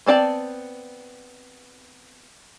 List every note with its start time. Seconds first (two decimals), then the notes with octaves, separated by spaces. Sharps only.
0.06 B3 C4 D5 F#5 A5